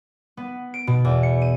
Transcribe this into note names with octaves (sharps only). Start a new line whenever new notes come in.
B3
D7
B2
E2
C#7
D#7